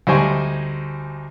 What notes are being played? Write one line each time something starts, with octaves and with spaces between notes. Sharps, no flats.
D2 G3 D#4 C5 G#5 C#6